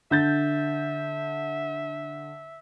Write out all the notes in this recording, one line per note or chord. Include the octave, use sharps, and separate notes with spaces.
D3 E5 G6 A6